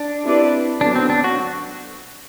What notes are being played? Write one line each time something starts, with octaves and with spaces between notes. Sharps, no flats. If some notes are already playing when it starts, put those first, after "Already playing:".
Already playing: D4
C4 E4 G4 B4 D5
D3 F#3 B3 D4
C4
D4
F#4